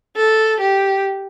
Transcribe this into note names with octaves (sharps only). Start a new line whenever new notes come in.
A4
G4